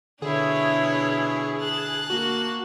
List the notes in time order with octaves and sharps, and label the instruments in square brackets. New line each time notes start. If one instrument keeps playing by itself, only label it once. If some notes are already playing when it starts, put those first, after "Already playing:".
[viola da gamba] B2 E4 [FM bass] D3 [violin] D4 C#5 [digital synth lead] G#4
[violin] A5 F#6
[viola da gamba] A#3 [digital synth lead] F#4